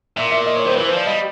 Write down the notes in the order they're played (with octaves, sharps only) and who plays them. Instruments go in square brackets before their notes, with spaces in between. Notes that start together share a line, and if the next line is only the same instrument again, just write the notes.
[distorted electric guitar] A#2 [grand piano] E5
[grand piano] E5
D#5
C#5
[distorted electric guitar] D#3 [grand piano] C5
[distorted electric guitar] E3 [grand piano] B4
[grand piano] C5
[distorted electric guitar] F3
[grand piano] D5
[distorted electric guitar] G3 [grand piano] D#5